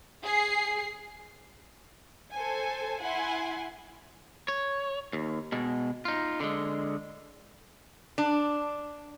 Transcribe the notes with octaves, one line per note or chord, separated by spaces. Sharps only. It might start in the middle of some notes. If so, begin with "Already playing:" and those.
G#4 C7
A4 C5 G#5
E4 F#5 G#5 C6
C#5
D#2
B2 G#3
D#4 F4
D3 G#3
D4